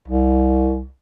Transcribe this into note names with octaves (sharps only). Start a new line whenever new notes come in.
C2